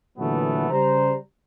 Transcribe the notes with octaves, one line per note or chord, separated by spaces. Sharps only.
A#2 D3 E3 F#3 A3 B3
C#3 G3 C5 A#5